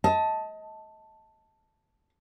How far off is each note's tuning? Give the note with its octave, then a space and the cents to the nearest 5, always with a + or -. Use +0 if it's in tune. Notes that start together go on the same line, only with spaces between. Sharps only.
D#5 +30 A5 +0